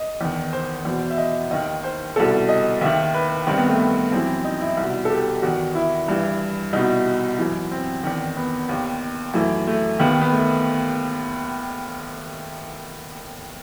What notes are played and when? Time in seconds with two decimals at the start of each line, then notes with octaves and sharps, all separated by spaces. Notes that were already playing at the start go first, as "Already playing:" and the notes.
Already playing: D#5
0.21 E2 D#3
0.53 C5
0.85 E2 B2
1.10 E5
1.18 D#5
1.51 D#2 D#3 D#5
1.84 C5
2.16 C2 B2 A4
2.49 D#5
2.81 D#2 D#3 E5
3.14 B4
3.47 G2 D#3 C4
3.58 B3
3.69 A3
3.80 B3
4.12 F#2 E3 C4
4.44 D#4
4.61 E4
4.77 C2 B2
5.05 A4
5.10 G4
5.42 E2 D#3 F#4
5.75 E4
6.08 G2 E3
6.73 C2 B2 D#4
7.39 F#2 E3
7.71 C4
8.03 E2 D#3
8.37 B3
8.69 D#2 D#3
9.34 F#2 E3 A3
9.67 A3
9.99 D#2 D#3 B3
10.21 B3
10.32 A3